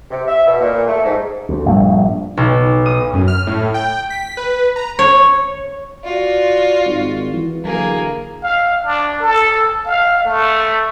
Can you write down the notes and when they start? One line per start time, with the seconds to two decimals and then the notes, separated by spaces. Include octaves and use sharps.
0.11 C3
0.28 E5
0.46 B2
0.61 A#2
0.88 A3
1.04 G#2
1.49 D2
1.66 A#1 G2 A3
2.37 B1
2.86 D#6
3.13 F#2
3.28 F6
3.47 A2
3.74 G5
4.10 B6
4.37 B4
4.76 A#5
4.99 C#5
6.04 F4 F#4 D5
6.84 G#1
7.32 E3
7.64 D3 E3 F#3 A#3 G#4
8.42 F5
8.85 D4
9.20 A4
9.85 F5
10.25 A3